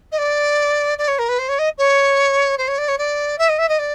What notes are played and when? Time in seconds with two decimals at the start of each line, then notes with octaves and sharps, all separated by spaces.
0.12 D#5
0.18 D5
0.98 D5
1.08 C#5
1.19 A#4
1.29 B4
1.39 C5
1.49 C#5
1.59 D#5
1.78 C#5
2.58 C5
2.68 C#5
2.78 D5
2.88 C#5
2.98 D5
3.38 E5
3.49 D#5
3.58 E5
3.69 D#5
3.79 D5